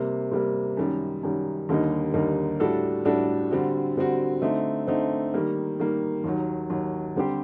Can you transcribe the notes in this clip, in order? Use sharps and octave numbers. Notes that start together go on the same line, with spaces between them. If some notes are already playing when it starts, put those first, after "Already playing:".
Already playing: C3 G3 A#3
C3 G3 A#3
F#2 D#3 G3
F#2 D#3 G3
D#2 D3 G3 A#3 D#4
D#2 D3 G3 A#3 D#4
A2 G3 D4 F#4 A4
A2 G3 D4 F#4 A4
D3 G3 C4 F#4
D3 G3 C4 F#4
D3 A3 C4 D#4
D3 A3 C4 D#4
D#3 G3 A#3
D#3 G3 A#3
D#2 D#3 F#3
D#2 D#3 F#3
D3 G3 C4 G4 C5